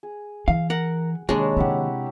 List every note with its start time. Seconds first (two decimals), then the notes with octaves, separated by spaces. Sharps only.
0.03 G#4
0.48 E3 F5
0.70 A#4 F#5
1.29 D#2 C3 G#3 D4 C#5 A5 A#5
1.57 C3 C4 E4 G4 F#5